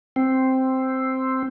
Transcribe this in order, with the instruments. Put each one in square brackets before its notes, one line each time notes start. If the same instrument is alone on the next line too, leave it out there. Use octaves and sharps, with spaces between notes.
[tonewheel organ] C4